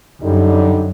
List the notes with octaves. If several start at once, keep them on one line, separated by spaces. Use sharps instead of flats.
F#2 D3 G3 D#4